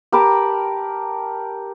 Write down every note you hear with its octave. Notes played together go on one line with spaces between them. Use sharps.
G4 A#4 A5 B5